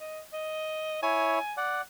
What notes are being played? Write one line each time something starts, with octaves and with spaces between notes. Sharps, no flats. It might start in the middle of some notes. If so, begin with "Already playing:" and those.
D#5
D#5
E4 C#5 G#5
D5 F#5